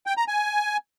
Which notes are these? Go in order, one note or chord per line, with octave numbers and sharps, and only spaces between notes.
G5
A#5
G#5